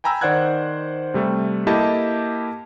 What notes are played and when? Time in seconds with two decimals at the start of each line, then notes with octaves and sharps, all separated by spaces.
0.04 G5 G#5 A#5 B5 E6
0.21 D#3 C5 D5 F#5 F#6 G#6
1.14 C3 G3 A3
1.67 A#3 E4 G4 A4 D#5 A5